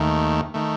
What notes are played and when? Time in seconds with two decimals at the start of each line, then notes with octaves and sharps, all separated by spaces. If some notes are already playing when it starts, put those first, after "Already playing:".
Already playing: D#2 D#3 A3
0.54 D#3 A3